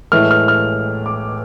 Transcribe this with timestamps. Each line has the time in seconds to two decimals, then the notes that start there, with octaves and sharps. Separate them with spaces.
0.12 A2 E3 G#3 F6
0.31 F6
0.48 F6
1.06 D6